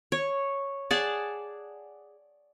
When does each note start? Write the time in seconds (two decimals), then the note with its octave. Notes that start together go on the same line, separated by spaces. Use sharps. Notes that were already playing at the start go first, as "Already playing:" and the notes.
0.12 C#5
0.91 G#4 D5 F#5 A5